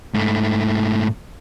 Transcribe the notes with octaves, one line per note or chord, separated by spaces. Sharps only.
G#2 A3